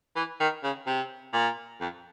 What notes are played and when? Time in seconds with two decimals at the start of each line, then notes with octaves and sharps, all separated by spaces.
0.16 E3
0.40 D#3
0.64 C#3
0.87 C3
1.34 A#2
1.81 F2